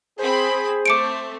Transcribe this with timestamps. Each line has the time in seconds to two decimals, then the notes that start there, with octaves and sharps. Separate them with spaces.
0.19 C4 G#4 C5 B5
0.86 A3 C4 D6 C#7 D7